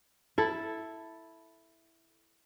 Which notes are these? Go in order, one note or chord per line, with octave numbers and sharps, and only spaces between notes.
E4 A4